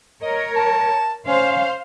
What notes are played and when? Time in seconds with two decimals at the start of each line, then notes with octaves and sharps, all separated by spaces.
0.22 A#4 C#5 D#5
0.56 A5
1.27 C#4 C5 F5